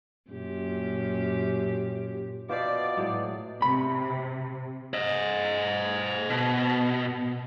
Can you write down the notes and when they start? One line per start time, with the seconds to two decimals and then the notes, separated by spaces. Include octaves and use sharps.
0.31 F#2 A#2 G4
2.49 B2 F4 C5 D5 E5 D6
2.97 A2 F#3 G#3
3.62 C3 B5
4.94 C5 D#5
6.30 B2